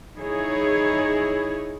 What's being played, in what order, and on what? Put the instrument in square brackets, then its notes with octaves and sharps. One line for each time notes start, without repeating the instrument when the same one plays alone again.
[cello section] D#4 E4 G#4 C#5